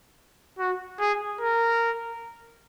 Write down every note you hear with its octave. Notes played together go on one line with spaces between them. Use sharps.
F#4
G#4
A#4